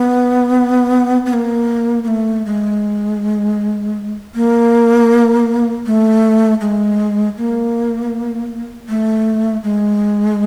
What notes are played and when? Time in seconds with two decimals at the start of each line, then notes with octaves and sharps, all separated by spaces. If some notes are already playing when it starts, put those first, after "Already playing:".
Already playing: B3
1.26 B3
1.33 A#3
2.04 A#3
2.08 A3
2.46 G#3
4.35 A#3
5.86 A3
6.61 G#3
7.38 A#3
8.89 A3
9.64 G#3